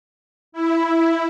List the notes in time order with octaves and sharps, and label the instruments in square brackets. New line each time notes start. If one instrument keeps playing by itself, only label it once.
[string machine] E4